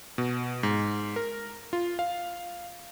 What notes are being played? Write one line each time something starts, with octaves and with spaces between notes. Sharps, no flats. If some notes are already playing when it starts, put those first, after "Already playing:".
B2
G#2
A#4
F4
F5